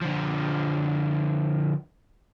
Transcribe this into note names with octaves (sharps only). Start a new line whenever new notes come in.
D3 F3